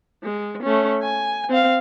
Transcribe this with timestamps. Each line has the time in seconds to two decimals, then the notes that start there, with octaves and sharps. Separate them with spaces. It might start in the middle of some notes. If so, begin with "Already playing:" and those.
0.23 G#3
0.63 A3 C#4
1.02 G#5
1.50 C4 F5